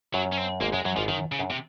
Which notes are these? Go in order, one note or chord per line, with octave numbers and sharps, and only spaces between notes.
F#2 F#3
C#4
C4
G#1 G#2 A#3
F#2 G#3
F#2 F#3
G#1 G#2 F3
F#2 D#3
C#3
F#2
C3